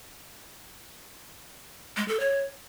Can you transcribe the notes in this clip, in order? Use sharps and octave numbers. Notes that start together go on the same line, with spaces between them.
G#3
A4
C#5